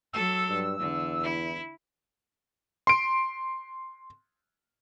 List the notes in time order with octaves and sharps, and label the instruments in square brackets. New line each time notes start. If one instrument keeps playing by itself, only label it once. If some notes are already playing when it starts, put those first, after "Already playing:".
[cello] F#3 A4 [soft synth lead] E6
[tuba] G2
[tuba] E2 [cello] D3
[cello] E4
[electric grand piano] C6 D7